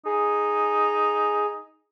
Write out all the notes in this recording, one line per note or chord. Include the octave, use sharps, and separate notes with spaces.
D#4 G#4